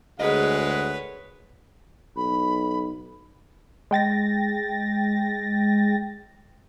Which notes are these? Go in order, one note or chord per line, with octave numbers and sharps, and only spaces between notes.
D2 G#3 G#4 A#4 B4 C#5 D#5 F#5
B1 B5
G#3 G5 A6 A#6